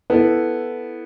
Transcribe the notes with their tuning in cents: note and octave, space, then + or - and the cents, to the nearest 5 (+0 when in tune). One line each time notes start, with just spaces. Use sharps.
B3 +0 E4 +0 A4 +0